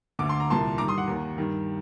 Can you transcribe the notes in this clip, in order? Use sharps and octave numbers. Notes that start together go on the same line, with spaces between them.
D2 D3 D6
C6
A#5
C2 A#2 A5 C6
G2 D#3 A#5 D6
C6 D#6
F#5
D#2 D#3
G2 D#3